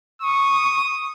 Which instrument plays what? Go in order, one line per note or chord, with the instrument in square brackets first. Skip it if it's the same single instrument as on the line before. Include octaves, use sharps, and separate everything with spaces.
[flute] C#6 [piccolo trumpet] D#6